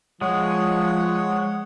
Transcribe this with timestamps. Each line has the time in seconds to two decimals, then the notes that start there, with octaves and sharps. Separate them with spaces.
0.21 F3 G#3 C#5 F#5